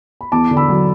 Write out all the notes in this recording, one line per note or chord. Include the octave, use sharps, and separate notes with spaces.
B5
E2 A5 D6
D3
B5 E6
F#3